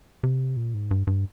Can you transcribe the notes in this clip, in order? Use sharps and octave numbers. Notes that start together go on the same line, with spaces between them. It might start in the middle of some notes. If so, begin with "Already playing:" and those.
C3
A#2
G#2
G2
G2